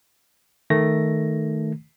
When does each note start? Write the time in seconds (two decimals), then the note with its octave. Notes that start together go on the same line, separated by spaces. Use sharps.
0.70 D#3 A3 A#6